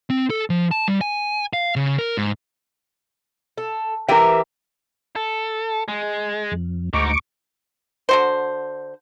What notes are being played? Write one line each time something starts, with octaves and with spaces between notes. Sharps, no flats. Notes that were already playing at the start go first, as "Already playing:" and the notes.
C4
A4
F3
A5
G3
G#5
F5
C#3
A#4
G#2
A4
E3 G4 A#4 E5 G5
A4
G#3
F2
D2 G#2 D#4 C#6 D6
D3 F#4 C5